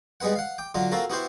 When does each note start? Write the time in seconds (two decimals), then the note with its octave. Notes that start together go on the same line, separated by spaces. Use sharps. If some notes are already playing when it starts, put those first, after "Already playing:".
0.20 G3 G#3 B3 B4 F#5
0.36 F5 F#5
0.58 G5 D6
0.74 D3 F#3 D4 F4
0.91 A#3 C4 F4 F#4 A4 A#4
1.10 B3 E4 F#4 G4 C5